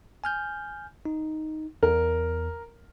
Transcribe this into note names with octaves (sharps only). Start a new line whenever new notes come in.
G#5 F6 G6
D#4
E2 A#4